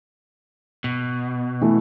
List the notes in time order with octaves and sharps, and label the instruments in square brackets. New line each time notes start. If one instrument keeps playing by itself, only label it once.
[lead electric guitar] B2
[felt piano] E3 A3